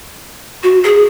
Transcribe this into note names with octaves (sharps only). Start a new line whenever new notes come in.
F#4
G#4